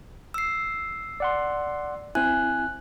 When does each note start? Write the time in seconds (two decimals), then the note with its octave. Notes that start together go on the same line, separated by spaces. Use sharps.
0.34 E6 C7
1.20 D5 F#5 C6
2.15 C4 E4 G#5 F#6